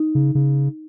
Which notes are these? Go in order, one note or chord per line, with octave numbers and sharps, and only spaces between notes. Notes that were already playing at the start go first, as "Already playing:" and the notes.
Already playing: D#4
C#3
C#3